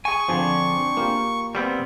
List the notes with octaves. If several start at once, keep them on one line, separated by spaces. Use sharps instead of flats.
G#4 G#5 C#6
D3 F3 C4 D4 G#4
A#3 F4 G4
G3 B3 C4